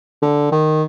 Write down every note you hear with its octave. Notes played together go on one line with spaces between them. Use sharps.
D3
D#3